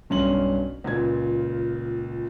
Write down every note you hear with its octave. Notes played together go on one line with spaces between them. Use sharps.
B1 G2 C#4 C6 F#7
C#2 A#2 G#6